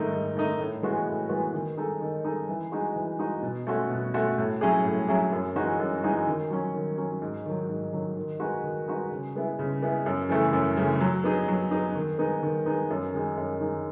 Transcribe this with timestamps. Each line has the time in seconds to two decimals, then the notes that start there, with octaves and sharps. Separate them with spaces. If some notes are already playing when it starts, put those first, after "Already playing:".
Already playing: G#2 D#3 A3 D#4
0.11 G#2
0.35 D#3 A3 D#4
0.59 A2
0.83 E3 G#3 B3 F#4
1.06 A2
1.29 E3 G#3 B3 F#4
1.53 D#3
1.77 G#3 D#4 A4
2.01 D#3
2.24 G#3 D#4 A4
2.48 E3
2.72 G#3 D#4 F#4
2.96 E3
3.19 G#3 D#4 F#4
3.42 B2
3.67 A3 C#4 F#4
3.90 B2
4.14 A3 C#4 F#4
4.38 A2
4.61 F#3 C#4 E4 G#4
4.85 A2
5.08 F#3 C#4 E4 G#4
5.32 F#2
5.55 E3 G#3 D#4 F#4
5.80 F#2
6.03 E3 G#3 D#4 F#4
6.27 D#3
6.50 F#3 C#4
6.74 D#3
6.98 F#3 C#4
7.21 G#2
7.46 D#3 F#3
7.69 G#2
7.93 D#3 F#3
8.17 D#3
8.40 G#3 D#4 F#4 B4
8.64 D#3
8.87 G#3 D#4 F#4 B4
9.11 C#3
9.35 G#3 B3 E4
9.59 C#3
9.82 G#3 B3 E4
10.06 F#2
10.29 C#3 E3 A3
10.53 F#2
10.77 C#3 E3 A3
11.00 F#3
11.24 B3 D#4 G#4
11.48 F#3
11.71 B3 D#4 G#4
11.95 D#3
12.19 G#3 B3 D#4
12.43 D#3
12.66 G#3 B3 D#4
12.90 F#2
13.13 D#3 G#3 D#4
13.37 F#2
13.61 D#3 G#3 D#4